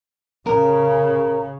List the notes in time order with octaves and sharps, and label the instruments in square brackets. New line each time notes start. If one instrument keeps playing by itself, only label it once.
[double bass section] C#3 [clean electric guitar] A#4